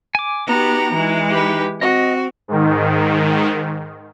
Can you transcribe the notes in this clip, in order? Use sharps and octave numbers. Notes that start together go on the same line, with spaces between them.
G#5 D6
B3 D#4 F#4 G4 A#5
E3 G#3
D#4 G4 B4
C4 F#4 D#5
G#2 D#3